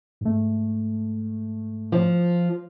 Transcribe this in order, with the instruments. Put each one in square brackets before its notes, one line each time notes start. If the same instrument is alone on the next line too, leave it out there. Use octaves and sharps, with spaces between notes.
[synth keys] G#2 A3
[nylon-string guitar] F3